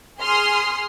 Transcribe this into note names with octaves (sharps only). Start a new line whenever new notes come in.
G#4 C6 D#6 F6 C7